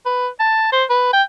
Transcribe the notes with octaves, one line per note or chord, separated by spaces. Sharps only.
B4
A5
C5
B4
G5